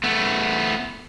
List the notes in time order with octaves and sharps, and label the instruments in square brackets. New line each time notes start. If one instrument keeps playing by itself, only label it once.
[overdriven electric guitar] A3 B3